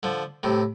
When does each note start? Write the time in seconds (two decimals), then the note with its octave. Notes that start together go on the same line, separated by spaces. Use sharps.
0.03 D3 F3
0.43 A2 C3